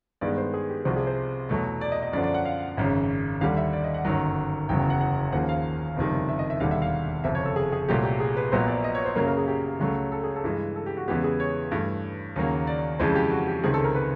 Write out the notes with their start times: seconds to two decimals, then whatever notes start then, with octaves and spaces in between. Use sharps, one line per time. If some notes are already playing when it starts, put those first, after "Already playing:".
0.21 G2 D#3 G#3 B3 D5
0.38 C5
0.54 G#4
0.69 G4
0.85 C2 C3 F3 F#4
0.96 G#4
1.07 C5
1.49 E2 B2 F#3 A3
1.81 D5
1.92 D#5
2.03 D#5
2.13 F#2 D3 F3 D5
2.24 D5
2.34 F#5
2.45 F5
2.77 G#1 F#2 C#3
3.41 D#2 D3 G3 F5
3.57 E5
3.73 D5
3.84 D#5
3.94 F#5
4.05 G1 F#2 D#3 F#3
4.69 F#1 E2 C#3 F#3 G5
4.79 G5
4.90 F#5
5.01 F#5
5.32 D#2 C#3 F3 A#3 F#5
5.49 F5
5.96 F#1 F2 C3 D#3 G3
6.29 E5
6.39 D#5
6.50 E5
6.60 E1 D#2 D3 G3 F5
6.71 E5
6.82 F5
7.24 F#1 F2 C3 E5
7.35 C#5
7.45 A4
7.56 G#4
7.72 G#4
7.88 C2 A#2 F#3 A3 G4
8.04 G4
8.20 G#4
8.36 B4
8.52 A#1 A#2 F#3 B3 C5
8.68 D5
8.84 D#5
8.95 C#5
9.05 C5
9.16 F#2 C#3 F#3 A#3 A#4
9.27 A#4
9.37 G#4
9.48 G4
9.80 C#2 C#3 F#3 A3
10.12 A4
10.24 G#4
10.36 A4
10.44 G2 E3 G#3
10.76 A4
10.86 G4
10.97 F#4
11.08 E2 C#3 E3 G#3 B3 G4
11.24 G#4
11.40 C#5
11.72 G2 E3 A3
12.36 D#2 C#3 F#3 A#3
12.67 D5
12.99 F2 C#3 E3 G#3 C5
13.16 G4
13.31 F#4
13.47 G4
13.64 C#2 C3 D#3 G#4
13.74 A4
13.84 A#4
13.95 B4